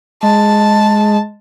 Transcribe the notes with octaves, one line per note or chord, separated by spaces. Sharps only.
G#3 A5